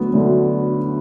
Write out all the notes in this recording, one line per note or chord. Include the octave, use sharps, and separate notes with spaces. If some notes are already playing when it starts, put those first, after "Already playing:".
Already playing: D2 D3 F#3 A3 B3
D2 D3 F#3 A3